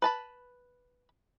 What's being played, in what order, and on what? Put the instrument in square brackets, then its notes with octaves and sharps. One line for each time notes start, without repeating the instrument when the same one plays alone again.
[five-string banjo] B4 A5 B5